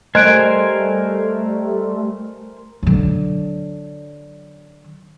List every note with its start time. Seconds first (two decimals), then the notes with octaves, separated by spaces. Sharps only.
0.15 G3 A3 A#4 C5 D#5 G#5 F#6 D7
2.83 D3 F#3